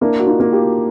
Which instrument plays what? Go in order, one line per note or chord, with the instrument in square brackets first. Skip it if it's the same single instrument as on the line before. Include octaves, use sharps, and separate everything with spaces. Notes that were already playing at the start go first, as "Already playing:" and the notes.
[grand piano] A#3 [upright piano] D4 E4
[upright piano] F#4
D#4 F4
[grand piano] A#3
[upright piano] F4 G4